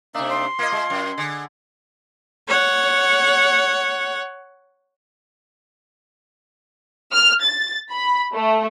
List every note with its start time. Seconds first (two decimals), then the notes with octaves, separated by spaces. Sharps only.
0.14 C3 A#3 D4 D#4 E5
0.30 C6
0.59 A#3 F4 D#5
0.72 G#3
0.90 F#2
1.18 D3 G#4
2.48 C#5 F#5
7.12 F6
7.42 A6
7.91 B5
8.34 A3